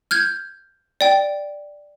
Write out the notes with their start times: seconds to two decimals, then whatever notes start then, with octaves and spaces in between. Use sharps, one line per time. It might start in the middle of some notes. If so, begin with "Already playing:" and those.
0.11 F6 G6 G#6
1.01 D5 G5